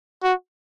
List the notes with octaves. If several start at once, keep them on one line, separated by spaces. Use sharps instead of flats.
F#4